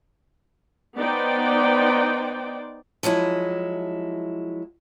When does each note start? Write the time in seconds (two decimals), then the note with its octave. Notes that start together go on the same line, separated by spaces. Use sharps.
0.99 B3 D#4 C5 D5 G5
3.03 F3 F#3 G#3 E4